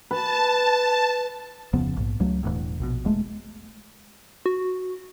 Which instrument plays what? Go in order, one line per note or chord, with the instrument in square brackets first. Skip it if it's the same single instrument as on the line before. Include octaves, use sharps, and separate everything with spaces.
[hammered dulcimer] B4 [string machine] A5
[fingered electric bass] D1 F2 C#3 B3
A#1 G#2
C#2 F#3 A3
E1 E2 A2
A#1 G#2 B2
E1 G#3 A3
[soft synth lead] F#4